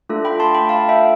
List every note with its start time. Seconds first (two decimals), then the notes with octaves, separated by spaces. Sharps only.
0.09 A3 D4 F4 A4
0.25 G5 B5
0.40 A5 C6
0.54 G5 B5
0.69 F5 A5
0.89 E5 G5